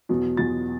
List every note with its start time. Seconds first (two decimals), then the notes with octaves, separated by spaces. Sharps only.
0.09 E2 B2 F#3
0.37 E2 B2 F#3 A6